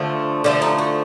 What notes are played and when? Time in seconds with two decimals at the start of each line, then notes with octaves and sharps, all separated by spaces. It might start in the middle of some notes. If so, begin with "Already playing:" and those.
Already playing: D3 F3 A3
0.44 D3 F3 A3
0.62 D#4
0.78 F#4